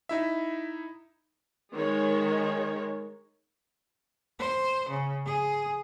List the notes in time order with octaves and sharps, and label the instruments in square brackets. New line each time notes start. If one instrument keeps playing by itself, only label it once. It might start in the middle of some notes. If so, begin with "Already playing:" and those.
[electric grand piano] D#4 E4 E5
[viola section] D#3 G#3 C#5
[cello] C5
C#3
G#4